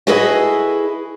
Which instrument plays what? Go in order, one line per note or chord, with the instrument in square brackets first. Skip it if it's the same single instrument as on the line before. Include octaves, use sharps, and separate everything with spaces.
[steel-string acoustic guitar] E4 F#4 G#4 A4 B4 D#5